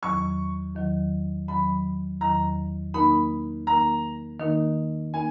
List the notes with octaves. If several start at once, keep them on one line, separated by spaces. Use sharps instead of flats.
E2 D#3 F#3 C#6
E2 D#3 F#3
E2 D#3 F#3 B5
E2 D#3 F#3 A#5
D#3 A#3 D#4 A#4 B5
D#3 A#3 D#4 A#4 A#5
D#3 A#3 D#4 A#4
A#3 D#4 A#4 G#5